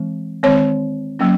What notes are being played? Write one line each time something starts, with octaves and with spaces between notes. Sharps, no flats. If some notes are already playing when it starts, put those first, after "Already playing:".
Already playing: E3 G#3 C4
D#3 G#3 C4 C#5
F#3 A#3 C#4